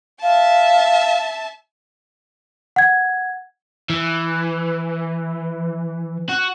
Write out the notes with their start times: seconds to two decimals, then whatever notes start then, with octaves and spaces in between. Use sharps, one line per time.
0.23 E5 F5 A5
2.76 F#5 G#6
3.90 E3
6.29 F#4